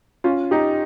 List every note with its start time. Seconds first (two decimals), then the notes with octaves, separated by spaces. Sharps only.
0.24 C#4 F4
0.51 D#4 G4